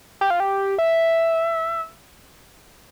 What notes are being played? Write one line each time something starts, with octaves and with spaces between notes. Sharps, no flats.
G4
F4
G4
E5